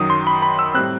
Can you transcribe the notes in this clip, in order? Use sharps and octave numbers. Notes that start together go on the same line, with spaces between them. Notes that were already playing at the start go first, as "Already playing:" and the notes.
Already playing: F#2 D#3 F#3 D#6
C6
B5
B5
E6
A2 G3 C4 F#6